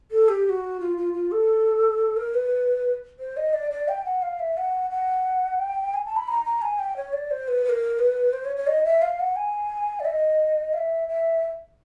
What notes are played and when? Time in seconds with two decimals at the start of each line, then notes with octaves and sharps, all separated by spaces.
0.11 A4
0.29 G4
0.46 G4
0.49 F#4
0.80 F4
0.98 F4
1.14 F4
1.32 A4
2.17 A#4
2.34 B4
3.19 C5
3.37 D#5
3.54 D5
3.71 D5
3.88 G5
4.05 F#5
4.22 F5
4.40 E5
4.57 F#5
4.91 F#5
5.59 G5
5.94 G#5
6.05 A5
6.16 B5
6.28 A#5
6.45 A#5
6.62 G#5
6.79 G5
6.97 C#5
7.13 D5
7.31 C5
7.48 B4
7.65 B4
7.70 A#4
7.99 B4
8.33 C5
8.45 C#5
8.56 C#5
8.67 D#5
8.85 E5
9.02 F5
9.20 F#5
9.36 G#5
10.00 D5
10.05 E5
10.10 D#5
10.74 F5
10.78 E5
11.08 E5